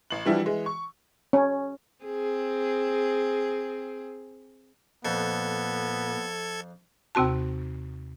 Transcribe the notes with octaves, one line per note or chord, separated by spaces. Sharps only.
A1 F#7
E3 F3 G3 D4 E4 F#4
E3 G#3
C#6
C#4
C4 G#4
F2 A#2 B3 A4 G#6
D#2 C3 C4 F#4 A5